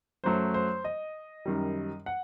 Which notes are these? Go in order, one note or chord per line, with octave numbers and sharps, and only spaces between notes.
F#2 F#3 A3 C5
C5
D#5
F#2 D#3 G3
F#5